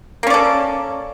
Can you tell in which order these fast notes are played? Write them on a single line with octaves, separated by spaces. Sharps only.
A#3 C#4 D5 A4